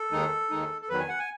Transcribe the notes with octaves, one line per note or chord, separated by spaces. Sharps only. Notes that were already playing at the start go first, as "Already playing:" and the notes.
Already playing: A4
D#2 D#3 G#3 D#4
D#2 D#3 G#3 D#4
A4
E2 D#3 F#3 B4
G#5
F#5
G#5